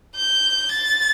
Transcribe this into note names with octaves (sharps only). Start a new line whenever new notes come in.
G6
A6